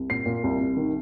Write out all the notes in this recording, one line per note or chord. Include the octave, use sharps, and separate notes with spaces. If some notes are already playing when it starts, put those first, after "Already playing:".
Already playing: C2
A#2 C7
A#2
C2
C2
D#3